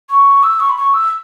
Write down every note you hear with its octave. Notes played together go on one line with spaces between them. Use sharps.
C#6
E6
C#6
B5
C#6
E6